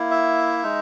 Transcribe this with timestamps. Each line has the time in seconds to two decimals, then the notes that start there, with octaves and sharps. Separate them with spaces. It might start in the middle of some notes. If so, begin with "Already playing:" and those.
Already playing: A#3 E4
0.11 E5
0.63 G#3 D#4